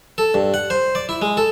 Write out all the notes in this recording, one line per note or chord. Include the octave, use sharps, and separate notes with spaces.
A4
G2
F#5
C5
D5
E4
G#3
A4